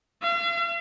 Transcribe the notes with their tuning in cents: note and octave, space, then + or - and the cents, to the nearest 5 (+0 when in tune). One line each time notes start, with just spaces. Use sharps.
F5 -45